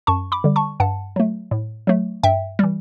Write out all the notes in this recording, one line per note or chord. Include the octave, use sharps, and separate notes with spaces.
F#2 A5 C#6
B5 D6
D3 G3
A5 C#6
G2 F#5 A5
F#3 A3
A2
F#3 A3
G2 E5 G5
E3 G3